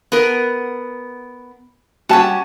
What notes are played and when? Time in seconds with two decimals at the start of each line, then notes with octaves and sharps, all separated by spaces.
0.12 B3 A#4
2.09 G3 C#4 F#4 A5